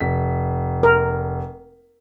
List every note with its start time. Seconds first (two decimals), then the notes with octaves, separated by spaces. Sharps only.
0.01 F1 B6
0.83 A#4